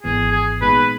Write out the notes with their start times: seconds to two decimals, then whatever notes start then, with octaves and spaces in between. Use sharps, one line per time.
0.03 G#1 G#2 E3 B3 G#4
0.32 G#4
0.62 A#2 G#3 B3 D#4 G#4 B4